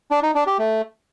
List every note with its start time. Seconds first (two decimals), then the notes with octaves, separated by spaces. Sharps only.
0.11 D4
0.23 D#4
0.35 D4
0.47 G4
0.59 A3